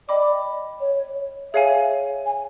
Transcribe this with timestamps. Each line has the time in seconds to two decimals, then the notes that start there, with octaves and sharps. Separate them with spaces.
0.09 D5 D#5 G5 B5 D6
0.81 C#5
1.53 G#4 C#5 E5 F5 G#5
2.26 G#5